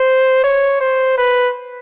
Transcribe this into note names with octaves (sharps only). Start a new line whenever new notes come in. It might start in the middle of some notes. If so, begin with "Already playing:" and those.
Already playing: C5
C#5
C5
B4